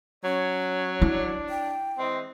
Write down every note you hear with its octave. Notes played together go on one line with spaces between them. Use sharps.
F#3 C#4 C#5
D4 E4
G5
E3 G#3 C4 D#5